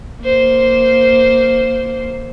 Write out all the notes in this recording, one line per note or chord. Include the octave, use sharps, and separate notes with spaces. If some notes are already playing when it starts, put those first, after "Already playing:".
A#3 C5